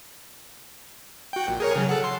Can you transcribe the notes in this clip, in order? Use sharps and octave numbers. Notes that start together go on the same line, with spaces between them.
F#4 G5
A#1
G#4 A#4 C#5
C#3 F#3
A4 F#5
C6